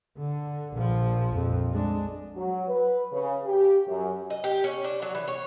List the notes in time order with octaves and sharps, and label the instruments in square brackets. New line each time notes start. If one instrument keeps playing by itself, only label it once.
[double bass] D3
A#1 F3
A#1 F2
G#3 D4
[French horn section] F#3
B4
C#3
G4
F#2
[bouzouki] D#5
G4
C#4
D4
F#3
E3
C#5